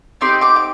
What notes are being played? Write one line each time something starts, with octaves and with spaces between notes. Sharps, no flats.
C4 D#4 G4 C6 D6
C6 D6
D6